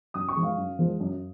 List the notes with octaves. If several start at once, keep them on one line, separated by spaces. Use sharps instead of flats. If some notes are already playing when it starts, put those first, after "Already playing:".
F#2 D#6
C#6
F3 G#3
F5
F#2
F3 G#3
F#2